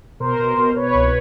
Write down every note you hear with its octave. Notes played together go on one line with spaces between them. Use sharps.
B2 A#4 C5
B2
B2
B2 B4 C#5
C2